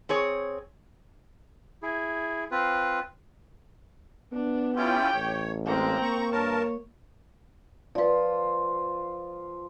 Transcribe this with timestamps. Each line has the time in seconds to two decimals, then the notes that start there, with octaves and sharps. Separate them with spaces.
0.09 C4 G#4 C#5
1.83 E4 G#4
2.51 C4 F4 B4
4.32 B3 D4
4.76 C#4 E4 F4 G4 G5
5.14 A1 C#5
5.66 A2 G#3 A#3 C4 A#5
6.02 A#3 C#6
6.32 G2 A#4 C#5 A5
7.95 F3 F4 B4 D5